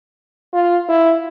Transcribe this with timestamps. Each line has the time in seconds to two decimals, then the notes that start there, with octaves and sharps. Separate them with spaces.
0.53 F4
0.89 E4